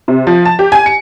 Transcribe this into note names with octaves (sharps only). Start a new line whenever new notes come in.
C3
F3
A5
G4
G#5
C#7